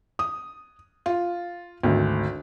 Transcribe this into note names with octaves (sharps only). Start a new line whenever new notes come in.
D#6
F4
G#1 D2